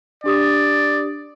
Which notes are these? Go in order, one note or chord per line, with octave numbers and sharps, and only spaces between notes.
D4 G4 D5 D#6